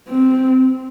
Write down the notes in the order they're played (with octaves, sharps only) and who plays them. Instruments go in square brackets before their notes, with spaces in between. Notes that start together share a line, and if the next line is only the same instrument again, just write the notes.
[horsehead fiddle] C4